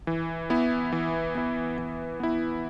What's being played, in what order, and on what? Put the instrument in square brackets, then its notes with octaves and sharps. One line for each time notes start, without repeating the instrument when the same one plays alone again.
[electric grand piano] E3
B3 E4
E3
B3 E4
E3
B3 E4